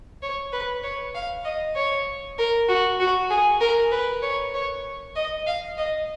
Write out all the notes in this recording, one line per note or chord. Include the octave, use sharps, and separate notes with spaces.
C#5
B4
C#5
F5
D#5
C#5
A#4
F#4
F#4
G#4
A#4
B4
C#5
C#5
D#5
F5
D#5